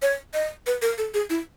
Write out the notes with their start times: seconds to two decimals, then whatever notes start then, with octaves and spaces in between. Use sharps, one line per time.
0.02 C#5
0.34 D#5
0.66 B4
0.82 A#4
0.98 A4
1.14 G#4
1.30 E4